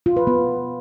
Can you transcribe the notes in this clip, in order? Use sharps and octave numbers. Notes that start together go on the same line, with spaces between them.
F4
B4
B3